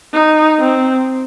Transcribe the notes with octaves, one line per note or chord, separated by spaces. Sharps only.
D#4
C4